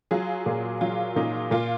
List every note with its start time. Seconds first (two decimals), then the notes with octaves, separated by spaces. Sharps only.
0.11 F#3 F4 G#4
0.46 A#2
0.81 F#3 F4
1.16 A#2 D#4
1.51 A#2 F4